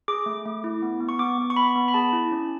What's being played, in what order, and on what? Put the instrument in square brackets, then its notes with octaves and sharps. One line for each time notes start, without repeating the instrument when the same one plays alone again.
[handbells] G#4 D6
A3
A3
E4
B3
B3
C#6
B3 D6
B3
C#6
B3 B5
B3
B5
G#4 A5
E4
C#4